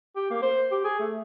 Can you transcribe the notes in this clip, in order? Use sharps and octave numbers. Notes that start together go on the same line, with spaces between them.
G4
A#3
C5
G4
G#4
A3